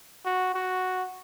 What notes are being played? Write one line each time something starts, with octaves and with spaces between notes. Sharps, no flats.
F#4
F#4